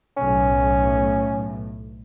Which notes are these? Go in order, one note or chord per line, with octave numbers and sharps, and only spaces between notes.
B1 A2 C#4